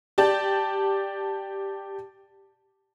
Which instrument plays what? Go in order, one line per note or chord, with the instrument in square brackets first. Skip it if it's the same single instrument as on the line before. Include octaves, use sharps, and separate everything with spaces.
[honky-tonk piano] G4 D5 A5